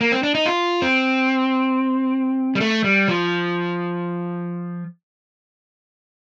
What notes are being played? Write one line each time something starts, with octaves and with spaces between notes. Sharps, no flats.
A#3
C4
D4
D#4
F4
C4
G3
A3
G3
F3